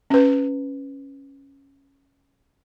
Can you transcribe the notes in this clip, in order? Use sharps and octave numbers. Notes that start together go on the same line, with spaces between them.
C#4 B4